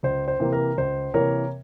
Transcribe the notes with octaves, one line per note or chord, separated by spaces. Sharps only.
C#2 C5
C5
C3 E3 A#3
A#4
C#2 C5
C3 E3 A#3 A#4 C#5